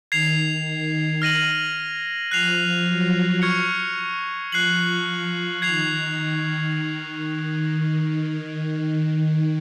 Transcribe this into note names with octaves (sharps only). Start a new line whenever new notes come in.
D#3 G#6 C7 F7
D#3
F6 A#6 D#7 F#7
F3 F#6 C7 F7
F#3
C#6 F6 G#6 C#7
F3 F#6 C7 F#7
D#3 G#6 C7 F7